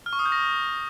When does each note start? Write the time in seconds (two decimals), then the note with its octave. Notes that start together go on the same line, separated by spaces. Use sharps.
0.06 F6
0.13 C#6
0.19 D#6
0.26 G6
0.32 A#6